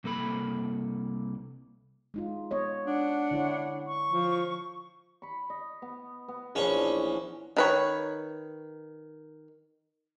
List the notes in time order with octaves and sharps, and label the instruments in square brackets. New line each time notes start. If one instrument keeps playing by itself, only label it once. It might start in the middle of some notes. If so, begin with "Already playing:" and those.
[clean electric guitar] C2 A#3 A4 B5
[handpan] G#3 D#4 F4
B3 C#5 D#5
[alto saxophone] D4 [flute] F#5
[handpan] D3 E4 C#5
[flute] C#6
[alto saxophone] F3
[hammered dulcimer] B5 C#6
D#5
B3
B3
[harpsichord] A#1 C#4 C#6 [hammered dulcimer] E3 D4 E4
[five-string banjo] D#3 B4 C#5